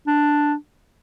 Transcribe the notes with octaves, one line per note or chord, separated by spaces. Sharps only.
D4